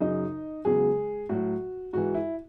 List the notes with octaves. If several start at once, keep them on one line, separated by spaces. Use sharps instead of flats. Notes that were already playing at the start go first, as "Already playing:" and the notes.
F#2 C#3 F#3 D#4 D#5
E2 C#3 F#3 G#3 G#4
A2 F#3 F#4
G#2 E3 F#4
E4